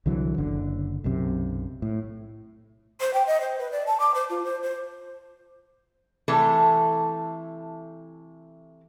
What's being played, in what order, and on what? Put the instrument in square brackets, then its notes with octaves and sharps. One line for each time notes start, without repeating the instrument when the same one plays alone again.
[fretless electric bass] C2 D3 E3 F#3
F#1 D3
B1 F#2 C3
A2
[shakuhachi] C5
G5
D#5
C5
B4
D5
A5
D6
C5
F4
C5
C5
[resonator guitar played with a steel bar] C3 E3 A3 A4 B4